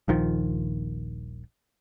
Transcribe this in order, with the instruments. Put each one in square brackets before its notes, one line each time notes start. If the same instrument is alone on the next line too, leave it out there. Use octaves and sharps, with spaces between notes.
[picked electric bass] D#1 A#1 D#3 F3